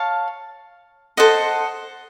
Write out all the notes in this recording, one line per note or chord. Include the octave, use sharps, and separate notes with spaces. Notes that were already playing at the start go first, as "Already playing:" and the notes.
Already playing: C#5 F5 A5
A4 C5 D#5 F#5